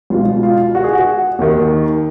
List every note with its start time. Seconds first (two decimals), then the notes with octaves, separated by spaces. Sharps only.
0.10 C#2 B2 F4
0.43 F4
0.75 F#4
0.84 G#4
0.93 F#4
1.39 D#2 D#3